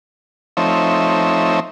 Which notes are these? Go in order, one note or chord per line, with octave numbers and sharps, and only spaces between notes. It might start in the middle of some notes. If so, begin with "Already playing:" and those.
F3 A3 C4 D#4 C#5 E5